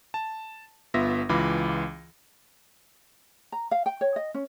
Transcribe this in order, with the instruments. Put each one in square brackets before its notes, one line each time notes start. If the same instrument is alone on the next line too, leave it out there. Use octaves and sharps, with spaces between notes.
[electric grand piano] A5
G1 B3 F4 E5 A#6
C#2 E3 F4 F5 B5 D6
[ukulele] A#5
F5
G5
C#5
D#5
C#4